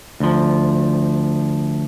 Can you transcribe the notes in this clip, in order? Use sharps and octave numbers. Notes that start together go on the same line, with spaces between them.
D2 F3